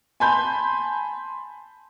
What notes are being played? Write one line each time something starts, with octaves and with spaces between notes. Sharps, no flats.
G#5 A5 B5 C6 G6